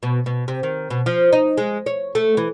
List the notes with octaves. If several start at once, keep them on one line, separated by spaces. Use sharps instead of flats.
B2
B2
C3
D#3
B2
F3
D#4
G#3
C#5
A3
E3